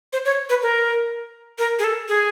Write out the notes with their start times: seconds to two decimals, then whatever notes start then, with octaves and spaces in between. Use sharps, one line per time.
0.13 C5
0.25 C#5
0.49 B4
0.62 A#4
1.59 A#4
1.79 G#4
1.84 A4
2.08 G#4